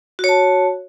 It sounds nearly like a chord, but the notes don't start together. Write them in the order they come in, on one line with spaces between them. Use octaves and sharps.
F#4 C#5 A5